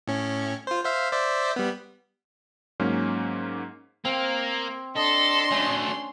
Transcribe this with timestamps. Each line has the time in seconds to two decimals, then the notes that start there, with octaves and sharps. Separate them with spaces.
0.07 A2 C#4
0.67 F4 C5
0.85 C5 E5 F5
1.12 C5 D5 E5
1.56 G3 B3
2.80 G#2 F#3 A#3 C#4
4.05 A#3 C4
4.96 D4 A4 D#5 C6
5.51 F#3 A3 C#4